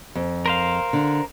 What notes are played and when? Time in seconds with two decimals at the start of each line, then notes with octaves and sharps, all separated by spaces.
0.15 F2
0.46 A#4 C5 F5
0.93 D3